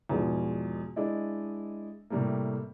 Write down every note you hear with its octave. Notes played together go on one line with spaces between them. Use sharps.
E2 G#2 B2 F3 G#3
G#3 D4 E4 D#5
A2 C3 G3 A3 A#3